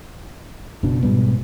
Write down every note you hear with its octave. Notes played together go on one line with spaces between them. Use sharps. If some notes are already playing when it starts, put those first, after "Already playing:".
F#1 B2 D4
G#2 B2 G3 B3